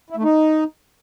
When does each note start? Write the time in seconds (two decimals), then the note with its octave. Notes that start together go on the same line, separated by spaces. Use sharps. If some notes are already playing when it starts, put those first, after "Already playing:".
0.10 E4
0.17 A3
0.23 D#4